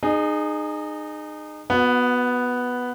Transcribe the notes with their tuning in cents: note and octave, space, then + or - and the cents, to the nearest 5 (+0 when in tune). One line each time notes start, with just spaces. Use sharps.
D#4 -30 G#4 +0
B3 +0 F#4 -30